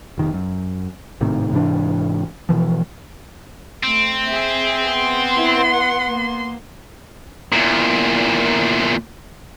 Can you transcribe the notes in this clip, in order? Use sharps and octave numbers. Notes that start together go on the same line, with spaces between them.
F1 D#3
F#2
G#1 A2 C3 D#3
G#2 C3 E3 D4
B2 E3 F3
A3 C4
G#4 E5
B3 C6
E4
F#5
A#3
E2 A#2